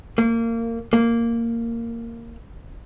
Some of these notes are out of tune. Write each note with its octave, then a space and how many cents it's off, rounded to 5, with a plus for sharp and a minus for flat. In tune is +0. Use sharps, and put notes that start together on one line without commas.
A#3 -25
A#3 -10